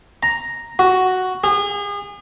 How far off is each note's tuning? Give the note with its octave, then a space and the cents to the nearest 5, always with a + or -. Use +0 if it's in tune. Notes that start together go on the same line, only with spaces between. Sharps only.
A#5 +0
F#4 +5
G#4 -35